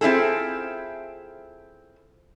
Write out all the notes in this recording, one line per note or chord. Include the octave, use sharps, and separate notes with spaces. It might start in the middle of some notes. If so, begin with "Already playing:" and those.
C4 E4 F4 G#4 A4